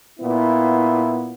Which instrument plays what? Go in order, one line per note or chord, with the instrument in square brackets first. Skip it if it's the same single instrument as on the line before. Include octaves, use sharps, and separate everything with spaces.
[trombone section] A#2 B3 E4